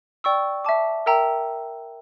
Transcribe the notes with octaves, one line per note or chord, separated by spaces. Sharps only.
D5 G5 C#6 E6
E5 A5 D6
A#4 E5 G5 A#5 E6